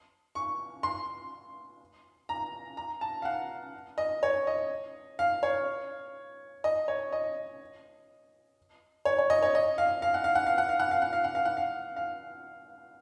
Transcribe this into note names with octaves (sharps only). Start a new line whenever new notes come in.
C#6
C6
A#5
A#5
A5
F5
F#5
D#5
C#5
D#5
F5
C#5
D#5
C#5
D#5
C#5
C#5
D#5
C#5
D#5
F5
F5
F#5
F5
F#5
F5
F#5
F5
F#5
F5
F#5
F5
F#5
F5
F#5
F5
F5